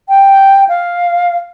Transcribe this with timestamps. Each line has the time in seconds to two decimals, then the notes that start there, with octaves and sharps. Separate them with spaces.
0.09 G5
0.69 F5